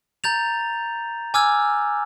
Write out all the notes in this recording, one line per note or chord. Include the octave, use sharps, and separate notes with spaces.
A#5 G6 A6 F7
G#5 D6 E6 F6 G#6